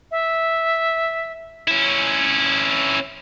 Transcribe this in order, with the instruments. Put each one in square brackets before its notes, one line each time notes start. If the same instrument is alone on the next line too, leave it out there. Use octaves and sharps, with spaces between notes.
[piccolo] E5
[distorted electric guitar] C#4 E4